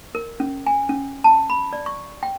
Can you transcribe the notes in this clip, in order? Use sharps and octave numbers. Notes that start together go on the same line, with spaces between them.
A#4
C#4
G#5
C#4
A5
B5
D5
C#6
G5